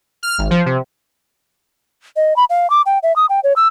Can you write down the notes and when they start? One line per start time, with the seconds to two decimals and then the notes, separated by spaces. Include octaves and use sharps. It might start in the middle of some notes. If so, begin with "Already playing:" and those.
0.23 F6
0.38 G#1
0.50 F3
0.66 C3
2.16 D#5
2.36 B5
2.50 F5
2.70 D6
2.86 G5
3.03 E5
3.16 D#6
3.29 G5
3.44 C#5
3.56 E6